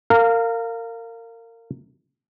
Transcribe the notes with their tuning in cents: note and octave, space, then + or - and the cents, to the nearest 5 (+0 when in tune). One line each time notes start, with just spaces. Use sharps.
A#4 -30 F5 +0